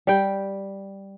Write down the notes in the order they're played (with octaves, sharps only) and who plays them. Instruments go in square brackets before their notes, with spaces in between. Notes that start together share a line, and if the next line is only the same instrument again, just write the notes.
[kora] G3 G5